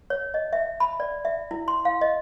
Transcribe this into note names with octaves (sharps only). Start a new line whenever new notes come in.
C#5
D#5
E5
B5
D5
E5
E4
C6
F5
D#5